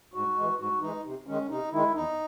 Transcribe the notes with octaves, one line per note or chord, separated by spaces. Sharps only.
G#2 F#4
E3 G#3
G#2 F#4
E3 G#3 D#4
C3
D#3 G#3 C#4
C3 D#4
D#3 G#3 E4
E2 D#4